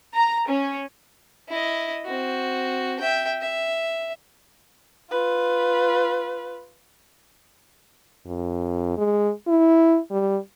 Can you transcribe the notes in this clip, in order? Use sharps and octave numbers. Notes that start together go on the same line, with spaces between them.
A#5
C#4
E4 D#5
C4 F#4
E5 G5
E5
F4 B4
F2
G#3
E4
G3